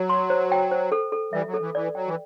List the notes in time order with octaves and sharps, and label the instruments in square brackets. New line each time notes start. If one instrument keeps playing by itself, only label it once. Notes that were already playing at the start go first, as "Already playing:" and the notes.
Already playing: [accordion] F#3
[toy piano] C6
C5
G5
C5
A4
A4
[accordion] E3 G3 [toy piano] E5
[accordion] F#3
[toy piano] A4
[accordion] E3
[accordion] E3 [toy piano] D5
[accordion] F#3 [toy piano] G5
[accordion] E3